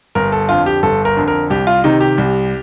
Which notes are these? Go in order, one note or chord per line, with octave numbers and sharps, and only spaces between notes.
G1 A#4
A4
F2 D3 F4
G4
G1 A4
A#4
F2 D3
A#4
C2 G4
F4
C3 D#3 D#4
G4
C2